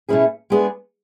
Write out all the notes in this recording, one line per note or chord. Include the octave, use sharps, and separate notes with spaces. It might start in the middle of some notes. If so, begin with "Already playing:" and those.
B2 A3 C#4 E4 G#4
G#3 B3 D4 G#4